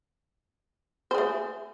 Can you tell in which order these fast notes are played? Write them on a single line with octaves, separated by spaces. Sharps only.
C5 G#4 A3